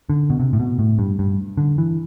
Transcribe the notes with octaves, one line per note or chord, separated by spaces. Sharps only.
D3
B2
C3
A2
B2
A2
G2
G2
D3
E3